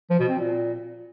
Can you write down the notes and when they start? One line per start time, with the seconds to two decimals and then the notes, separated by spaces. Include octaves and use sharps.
0.10 F3
0.19 B2
0.29 C4
0.38 A#2